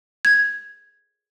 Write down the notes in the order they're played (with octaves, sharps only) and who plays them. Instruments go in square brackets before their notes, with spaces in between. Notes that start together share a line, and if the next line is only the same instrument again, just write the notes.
[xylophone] G#6